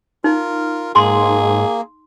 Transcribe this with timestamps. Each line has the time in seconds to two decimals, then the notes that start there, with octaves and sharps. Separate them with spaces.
0.24 D#4 F4 A#4
0.96 G#2 A#3 G#4 C6